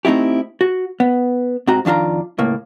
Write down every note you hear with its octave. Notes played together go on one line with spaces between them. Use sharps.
A3 C4 D#4 E4 G4
F#4
B3
G#2 C4 F#4 A#5
F2 D#3 D4 F4 A#5
C#2 A2 A#3